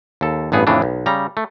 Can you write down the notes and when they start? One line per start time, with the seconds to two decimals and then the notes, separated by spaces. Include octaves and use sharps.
0.21 D#2 A4
0.52 A1 G2 B3 G#4
0.67 F2 A2 C#3 E3 D4
0.82 B1
1.06 C#3 G3 A#5
1.37 A3